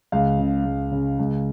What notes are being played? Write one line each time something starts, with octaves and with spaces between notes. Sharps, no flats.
C#2 F5
C#3
C#2
C#3
C#2